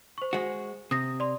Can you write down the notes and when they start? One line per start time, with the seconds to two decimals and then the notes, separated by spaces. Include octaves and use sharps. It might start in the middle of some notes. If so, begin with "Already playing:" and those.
0.18 C5 C#6
0.33 G#3 F#4
0.91 C3 D#6 A#6
1.20 D5 C6